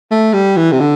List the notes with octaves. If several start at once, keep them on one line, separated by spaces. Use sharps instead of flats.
A3
G3
E3
C3
D3